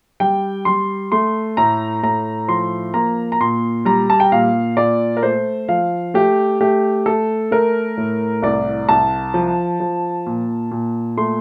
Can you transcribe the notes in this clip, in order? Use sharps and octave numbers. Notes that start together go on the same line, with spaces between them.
G3 G5
G3 C6
A3 C6
A2 A#5
A2 A#5
F3 C6
A#3 A#5
A#5
A#2 C6
G3 A#5
A5
G5
A#2 F5
A#2 D5
A#4
A3 C5
F3 F5
A3 G4
A3 G4
A3 A4
A3 A#4
A2
C2 D5
C2 A5
F3
F3
A#2
A#2
A3 C6